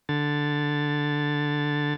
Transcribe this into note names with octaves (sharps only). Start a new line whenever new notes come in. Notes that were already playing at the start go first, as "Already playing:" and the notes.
D3 A6